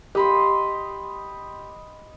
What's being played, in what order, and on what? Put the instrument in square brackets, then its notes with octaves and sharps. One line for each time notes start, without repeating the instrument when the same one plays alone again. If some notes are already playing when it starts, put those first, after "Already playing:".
[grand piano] G4 [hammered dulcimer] D#5 B5 C6